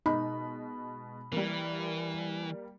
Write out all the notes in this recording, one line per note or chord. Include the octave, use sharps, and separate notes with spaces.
B2 G#3 D#4 B5
E3 G3 A#3